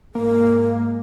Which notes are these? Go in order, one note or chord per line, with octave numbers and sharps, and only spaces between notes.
G#2 G#3 A#3 A#4